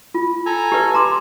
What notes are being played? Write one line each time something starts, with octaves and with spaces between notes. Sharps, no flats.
F4
A4 G#5 A#5
G4 B4
A#5 C6 D6